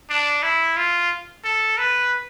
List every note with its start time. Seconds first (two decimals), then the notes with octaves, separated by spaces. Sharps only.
0.10 D4
0.43 E4
0.77 F4
1.44 A4
1.78 B4